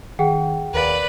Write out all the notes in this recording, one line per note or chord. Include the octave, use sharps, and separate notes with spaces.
D#3 G#4 F#5 G5
D#2 A#4 B4 D5 F5